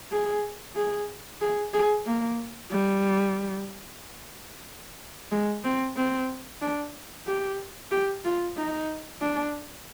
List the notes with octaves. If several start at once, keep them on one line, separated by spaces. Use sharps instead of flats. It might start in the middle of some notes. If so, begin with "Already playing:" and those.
G#4
G#4
G#4
G#4
A#3
G3
G#3
C4
C4
D4
G4
G4
F4
D#4
D4